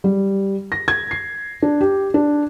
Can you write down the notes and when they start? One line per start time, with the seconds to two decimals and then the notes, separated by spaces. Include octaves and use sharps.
0.04 G3
0.72 A#6
0.88 G#6
1.11 C7
1.62 D4
1.81 G4
2.14 D4